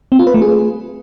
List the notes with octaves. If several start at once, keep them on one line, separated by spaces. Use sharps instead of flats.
C4
F4
B4
A3
G#4